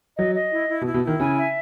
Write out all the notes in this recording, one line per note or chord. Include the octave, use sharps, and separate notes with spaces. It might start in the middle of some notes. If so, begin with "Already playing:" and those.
F#3 D#5
D#5
E4
E4
B2
E4
B2
D#3 E4
C#3 G#5
E5